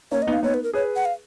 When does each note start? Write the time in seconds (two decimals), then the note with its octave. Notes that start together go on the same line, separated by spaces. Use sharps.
0.12 A#3 C#4 C#5
0.22 D#5
0.27 B3 D#4
0.33 F5
0.42 B3 D#4 C#5
0.54 B4
0.63 A#4
0.74 G#4 B4 C#5
0.96 F#5
1.05 F5